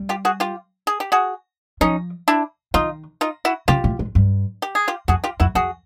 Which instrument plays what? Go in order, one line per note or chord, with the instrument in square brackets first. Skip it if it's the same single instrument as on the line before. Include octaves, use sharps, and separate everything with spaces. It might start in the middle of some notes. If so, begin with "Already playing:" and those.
Already playing: [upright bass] G3
[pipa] F4 G4
F#4 G#4
F4 G4
G#4
G4
F#4 G#4
[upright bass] F3 [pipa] C#4 D#4
[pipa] D4 E4
[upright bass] D#3 [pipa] D#4 F4
[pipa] D#4 F4
E4 F#4
[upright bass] C#3 [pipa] F4 G4
[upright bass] A2
G#2
G2
[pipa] G4
G#4
F4 G4
[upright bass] F2 [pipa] F#4 G#4
[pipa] F4 G4
[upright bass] F2 [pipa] E4 F#4
[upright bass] F2 [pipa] F#4 G#4